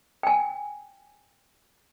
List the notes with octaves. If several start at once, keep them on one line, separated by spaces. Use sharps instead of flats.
G5 G#5